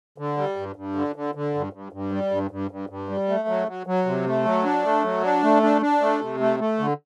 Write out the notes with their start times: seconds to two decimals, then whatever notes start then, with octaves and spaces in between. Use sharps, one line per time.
0.18 D3
0.37 G3
0.56 G2
0.76 G2
0.95 D3
1.16 D3
1.35 D3
1.55 G2
1.73 G2
1.92 G2
2.12 G3
2.31 G2
2.51 G2
2.71 G2
2.89 G2
3.09 G3
3.29 A3
3.48 F#3
3.68 F#3
3.87 F#3
4.06 C3
4.26 A3
4.45 F#3
4.64 D4
4.84 A3
5.03 F#3
5.23 D4
5.43 A3
5.63 D4
5.82 D4
6.01 A3
6.21 C3
6.40 A3
6.60 A3
6.79 D3